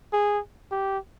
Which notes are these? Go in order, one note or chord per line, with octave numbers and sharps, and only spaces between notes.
G#4
G4